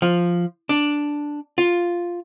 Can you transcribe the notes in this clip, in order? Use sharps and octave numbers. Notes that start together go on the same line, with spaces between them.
F3
D4
F4